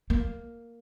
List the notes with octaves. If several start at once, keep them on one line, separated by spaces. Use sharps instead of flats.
A#3